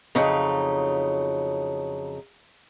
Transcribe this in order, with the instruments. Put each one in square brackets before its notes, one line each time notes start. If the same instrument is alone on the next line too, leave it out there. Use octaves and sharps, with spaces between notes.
[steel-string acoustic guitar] F2 C#3 F#3 D#4